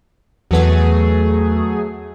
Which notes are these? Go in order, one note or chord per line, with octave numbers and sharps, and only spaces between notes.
E2 F#3 A3 B3 G#4